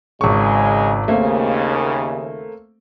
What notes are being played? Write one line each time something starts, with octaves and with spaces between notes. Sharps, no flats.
G#1 C#3 G#3 C#6
D#2 C#3 A3 A#3 C4